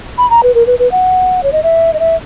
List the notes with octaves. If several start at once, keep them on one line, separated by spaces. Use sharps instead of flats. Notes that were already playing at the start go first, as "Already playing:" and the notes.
B5
A#5
B4
A#4
B4
B4
F#5
C#5
D#5
E5
D#5
E5